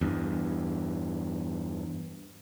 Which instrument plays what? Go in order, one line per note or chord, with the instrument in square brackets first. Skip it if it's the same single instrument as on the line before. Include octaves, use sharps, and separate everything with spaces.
[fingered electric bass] E2 G2